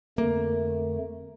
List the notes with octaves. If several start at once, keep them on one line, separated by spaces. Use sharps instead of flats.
F2 D3 A3 A#3